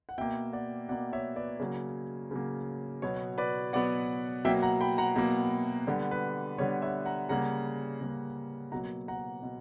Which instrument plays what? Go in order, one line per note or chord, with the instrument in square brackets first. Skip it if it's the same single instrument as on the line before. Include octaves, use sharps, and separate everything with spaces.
[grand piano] F#5
B2 A#3 E5 G5
D5 F#5
B2 D5 F#5
A#3
C#5 E5
B4 D5
C#3 F#3 A#3 C#5
C#3 F#3 A#3
B2 F#3 B3 C#5
B4 D5
B2 F#3 B3 D5 F#5
B2 F#3 A#3 E5 G5
F#5 A#5
G5 B5
F#5 A#5
B2 F#3 A#3
D3 G3 B3
B4
D3 G3 B3 C#5
C#5 E5
F#5 A#5
C#3 G3 A#3 F#5 A#5
C#3 G3 A#3
B2 F#3 A#3 F#5 A#5
F#5 A#5
B2